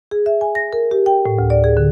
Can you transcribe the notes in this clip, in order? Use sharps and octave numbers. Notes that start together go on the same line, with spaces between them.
G#4
E5
G#5
A#6
A#4
G4
G5
A2
D2
D5
G#4
D3